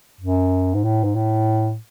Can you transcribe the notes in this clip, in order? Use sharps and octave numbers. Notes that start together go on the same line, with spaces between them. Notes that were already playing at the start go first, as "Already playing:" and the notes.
F#2
G#2
A2
G#2
A2